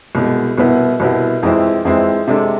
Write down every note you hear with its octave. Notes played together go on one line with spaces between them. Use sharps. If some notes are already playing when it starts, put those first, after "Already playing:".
C2 B2 G#3
C2 B2 B3 E4
C2 B2 B3 E4
F2 E3 G#3 C4 E4
F2 E3 G#3 C4 E4
C3 G#3 D4 A4